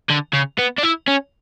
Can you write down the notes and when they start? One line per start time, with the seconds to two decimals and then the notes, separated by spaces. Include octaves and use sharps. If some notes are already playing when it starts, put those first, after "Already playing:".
0.10 D3
0.33 C#3
0.58 B3
0.78 D4
0.83 E4
1.08 C#4